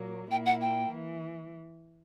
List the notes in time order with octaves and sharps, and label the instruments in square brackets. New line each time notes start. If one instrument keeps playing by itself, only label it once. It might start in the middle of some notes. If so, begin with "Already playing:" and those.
Already playing: [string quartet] A#2 F#3 A#3
[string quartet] A#2 A#3 E4 [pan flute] G5
[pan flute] F#5
G5
[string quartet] E3